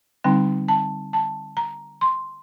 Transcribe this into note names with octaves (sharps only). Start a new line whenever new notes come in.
D3 G3 C4 D#4 G5
A5
A5
A#5
C6